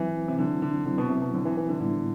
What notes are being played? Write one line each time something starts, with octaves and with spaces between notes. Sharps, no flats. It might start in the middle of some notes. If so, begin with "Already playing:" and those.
Already playing: E3 F#3 C4 E4
C3
D3 F#3 C4 E4
D3
D3 F#3 C4 E4
B2
C3
B2
D3 F#3 C4 E4
E3
E3
D3
A2 D3 G3 B3 E4